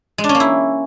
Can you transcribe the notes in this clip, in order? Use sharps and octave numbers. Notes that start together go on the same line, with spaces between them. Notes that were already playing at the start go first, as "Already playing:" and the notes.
G#3
D4
C#4
A#3
E4